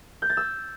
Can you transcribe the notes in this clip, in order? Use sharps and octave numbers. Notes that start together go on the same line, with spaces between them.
G6
A6
E6